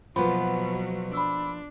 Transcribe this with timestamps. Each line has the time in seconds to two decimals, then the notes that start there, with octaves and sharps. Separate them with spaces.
0.16 B2 F3 F#3 A#3 B3 B5
1.13 D4 B5 E6